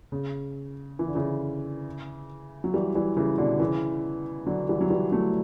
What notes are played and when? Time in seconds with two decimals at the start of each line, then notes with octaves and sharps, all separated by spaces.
0.12 C#3
0.99 E3
1.07 D3
1.15 C#3 E3
2.64 F#3
2.74 E3 G3
2.95 E3 G3
3.17 C#3 E3
3.38 B2 D3
3.60 C#3 E3
4.47 D3 F#3
4.69 E3 G3
4.81 F#3
4.90 E3 G3
5.12 F#3 A3